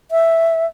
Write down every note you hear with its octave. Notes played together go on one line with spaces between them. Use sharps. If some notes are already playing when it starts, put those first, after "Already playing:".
E5